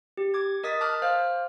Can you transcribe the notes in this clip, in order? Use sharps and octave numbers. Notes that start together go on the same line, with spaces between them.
G4
D6 G#6
A#4 D#5 D#6 A6 B6
A5 D6 F6 F#6
C5 F5 F6